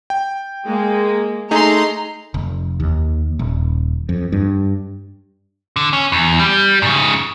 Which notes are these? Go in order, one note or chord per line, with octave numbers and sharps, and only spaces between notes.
G5
G#3 A#3
A3 D#4 G#4 A#5 C6
F1
D#2
D#1
F2
G2
D3
C#4
E2
G3
G#2 C#3